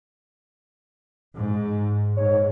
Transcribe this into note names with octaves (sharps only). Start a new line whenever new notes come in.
G#2
G#2 C#5